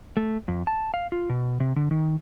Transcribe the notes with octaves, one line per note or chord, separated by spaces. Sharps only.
A3
F2
A5
F5
F4
B2
C3
D3
D#3